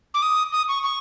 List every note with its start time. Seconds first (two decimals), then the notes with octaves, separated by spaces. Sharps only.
0.14 D6
0.22 D#6
0.52 D#6
0.68 C#6
0.83 C#6